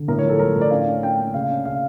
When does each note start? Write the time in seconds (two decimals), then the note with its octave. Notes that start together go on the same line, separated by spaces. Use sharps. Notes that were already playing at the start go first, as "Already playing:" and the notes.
Already playing: D3
0.08 A2 A#4
0.19 C#5
0.24 F3
0.29 A4
0.39 F3 A#4
0.55 A2
0.61 D5
0.71 C#4 F5
0.87 C#4
1.03 C#4 G5
1.18 A#3
1.34 C#3 F5
1.50 C#4
1.65 C#3 F5